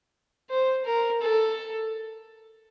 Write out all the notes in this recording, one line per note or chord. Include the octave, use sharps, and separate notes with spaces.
C5
A#4
A4